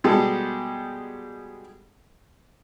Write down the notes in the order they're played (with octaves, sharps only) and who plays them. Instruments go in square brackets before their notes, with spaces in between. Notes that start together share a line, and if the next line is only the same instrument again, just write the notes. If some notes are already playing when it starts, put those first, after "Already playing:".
[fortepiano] B2 G3 G#3 G4 A4